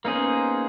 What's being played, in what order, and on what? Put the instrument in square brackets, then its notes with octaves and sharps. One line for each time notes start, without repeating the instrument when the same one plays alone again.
[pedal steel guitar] A#3 D#4 G#4 C5 [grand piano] B3 C#4